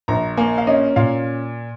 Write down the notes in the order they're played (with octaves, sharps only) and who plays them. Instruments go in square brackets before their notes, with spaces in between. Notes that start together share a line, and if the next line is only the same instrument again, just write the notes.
[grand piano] A#1 A#5
A#3 G#5
F5
C#4 D#5
A#2 F5